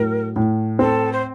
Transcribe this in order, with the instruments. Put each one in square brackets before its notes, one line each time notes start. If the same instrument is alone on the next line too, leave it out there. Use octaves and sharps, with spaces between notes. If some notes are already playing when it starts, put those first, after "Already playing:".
Already playing: [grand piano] A2 F#3 [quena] A#4
[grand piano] A2
[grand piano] C4 [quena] A4
[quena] C5